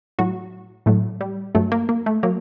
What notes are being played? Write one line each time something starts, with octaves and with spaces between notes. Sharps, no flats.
A2 F#3 F#4
A2 F#3 A3
G3
G2 F#3 A3
A#3
A#3
A3
F#3 A#3